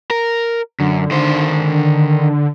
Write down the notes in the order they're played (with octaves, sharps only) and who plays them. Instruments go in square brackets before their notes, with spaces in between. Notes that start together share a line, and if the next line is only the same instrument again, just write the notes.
[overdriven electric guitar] A#4
[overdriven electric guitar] F#2 [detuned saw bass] D3
[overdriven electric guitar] D#3 C5